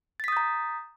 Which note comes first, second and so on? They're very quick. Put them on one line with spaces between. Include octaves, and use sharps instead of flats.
A6 B6 D#6 G6 A#5